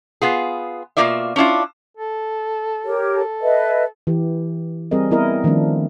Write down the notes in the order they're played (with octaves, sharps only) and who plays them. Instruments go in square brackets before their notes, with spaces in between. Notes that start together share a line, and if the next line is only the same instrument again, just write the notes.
[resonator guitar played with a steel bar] B3 F4 G#4
B2 A#3 B3 F4 D5 E5
C#4 D4 E4 F4
[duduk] A4
[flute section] G4 A#4 C#5
[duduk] A4
[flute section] B4 D#5 E5
[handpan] E3 G4
G3 C4 G#4 A#4 D#5
B3 E4 A#4 D#5
D#3 F3 A3 C4 D4